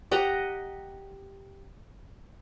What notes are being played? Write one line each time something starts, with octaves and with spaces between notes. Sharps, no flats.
G4 D#5 F#5 A#5